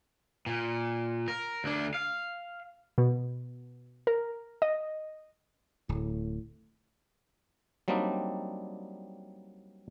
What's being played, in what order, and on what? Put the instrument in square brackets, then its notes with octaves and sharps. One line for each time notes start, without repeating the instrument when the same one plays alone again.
[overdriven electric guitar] A#2
A#4
D2 D4
F5
[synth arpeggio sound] B2
A#4
D#5
[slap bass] D1 [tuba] A2
[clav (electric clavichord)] F#3 G3 A#3 C4 D4 D#4